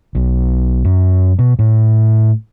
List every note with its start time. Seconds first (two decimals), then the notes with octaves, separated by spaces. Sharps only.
0.15 B1
0.84 F#2
1.39 B2
1.59 A2